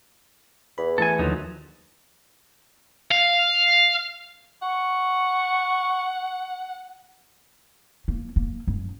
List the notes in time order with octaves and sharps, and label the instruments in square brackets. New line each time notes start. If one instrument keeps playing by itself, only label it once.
[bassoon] E2 [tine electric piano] B5
[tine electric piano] E3 A3 [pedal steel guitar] A4 G#5
[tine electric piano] D#2 D3 D#3 [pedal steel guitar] F3 F#3 D#4
[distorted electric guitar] F5
[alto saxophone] F#5 [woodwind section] C#6
[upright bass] A#3
A#3
F#2